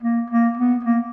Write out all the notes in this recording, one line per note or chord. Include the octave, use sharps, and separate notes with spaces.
A#3
A#3
B3
A#3